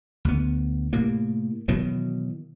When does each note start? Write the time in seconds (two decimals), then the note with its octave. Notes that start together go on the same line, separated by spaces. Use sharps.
0.25 D2 B3
0.93 A2 C3 A#3
1.68 B2 D#3 E3 F#3